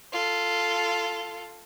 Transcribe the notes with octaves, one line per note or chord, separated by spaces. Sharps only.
F4 A4